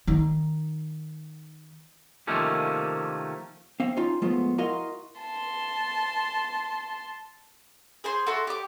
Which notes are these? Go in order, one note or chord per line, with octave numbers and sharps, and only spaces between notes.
D#3 D#4
C3 D#3 F3 A3 A#3 C#4
C4 F5
C#4 D#4 F4
F3 G#3 A3 B3 F4
E4 F#4 A#4 D#5 F5 C6
A5 C6
G#4 C5 C6
F#4 A4 E5 C6
G4 D6